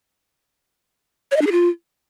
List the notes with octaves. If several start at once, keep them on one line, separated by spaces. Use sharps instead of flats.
C#5
D#5
D4
G#4
F4